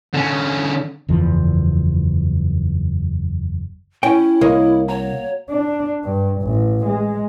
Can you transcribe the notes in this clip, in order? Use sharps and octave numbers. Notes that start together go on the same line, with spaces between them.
D3 C#4
F#1 E2 F3
C#4 E4 G5
C2 A#3 C#5 D#5
F#4 C#5 A#5
D4
G2
A1
G#3